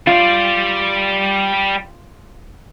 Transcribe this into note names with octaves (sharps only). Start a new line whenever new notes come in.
G3 F4 D5